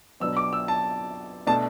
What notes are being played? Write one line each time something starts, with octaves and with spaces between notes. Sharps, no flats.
B2 F#3 B3 D4 E6
D6
E6
A5
B2 A3 D4 A5